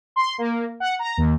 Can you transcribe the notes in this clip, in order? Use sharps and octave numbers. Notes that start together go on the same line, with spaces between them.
C6
A#3
F#5
A#5
D#2